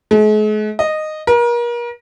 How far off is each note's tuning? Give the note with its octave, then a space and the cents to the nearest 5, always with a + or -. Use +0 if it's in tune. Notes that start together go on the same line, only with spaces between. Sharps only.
G#3 +45
D#5 -10
A#4 +35